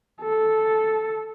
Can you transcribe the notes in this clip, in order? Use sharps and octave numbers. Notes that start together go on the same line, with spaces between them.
A4